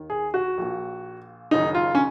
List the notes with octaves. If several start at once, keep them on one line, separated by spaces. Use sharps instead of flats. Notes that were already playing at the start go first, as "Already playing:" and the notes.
Already playing: D#2 D#3
G#4
F#4
A#1 A#2
F#1 F#2 D#3 D#4
F4
C#4